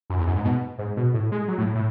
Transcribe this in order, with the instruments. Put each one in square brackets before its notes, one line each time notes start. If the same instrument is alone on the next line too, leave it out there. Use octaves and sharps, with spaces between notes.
[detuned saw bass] F#2
E2
F#2
G#2
B2
G#2
B2
A2
G#3
F#3
A2
A2